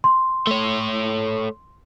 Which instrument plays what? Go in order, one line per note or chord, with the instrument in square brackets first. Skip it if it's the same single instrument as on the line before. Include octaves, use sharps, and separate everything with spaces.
[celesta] C6
[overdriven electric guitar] A3 C#5